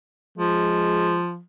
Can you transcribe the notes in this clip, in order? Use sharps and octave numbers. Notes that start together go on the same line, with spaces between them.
F3 G#3